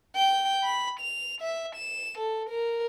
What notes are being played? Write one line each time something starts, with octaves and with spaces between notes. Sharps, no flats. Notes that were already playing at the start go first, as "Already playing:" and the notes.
G5
B5
F7
E5
E7
A4
A#4